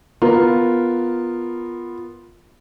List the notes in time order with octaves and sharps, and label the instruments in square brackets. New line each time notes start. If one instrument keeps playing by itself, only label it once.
[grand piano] B3 F4 A#4